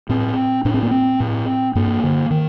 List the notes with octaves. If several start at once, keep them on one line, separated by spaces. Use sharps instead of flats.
A2 C4
A2 D4
C4
A#3
C4
A2
G2 A#3
D3
D#3